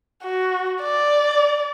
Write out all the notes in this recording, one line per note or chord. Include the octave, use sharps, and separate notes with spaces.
F#4
D5